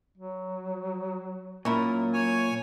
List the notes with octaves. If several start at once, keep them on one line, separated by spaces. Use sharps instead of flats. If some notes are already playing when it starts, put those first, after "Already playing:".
F#3
A#2 F#3 C#4 E4 A#4
C#5 G#5